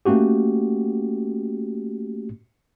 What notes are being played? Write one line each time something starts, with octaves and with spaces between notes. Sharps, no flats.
A3 A#3 C#4 F#4 G4